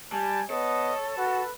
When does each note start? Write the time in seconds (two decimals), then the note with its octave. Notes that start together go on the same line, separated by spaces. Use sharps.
0.12 G3 G#5 A5
0.50 B3 A4 C#5 D#5
1.18 F#4 B4 F#5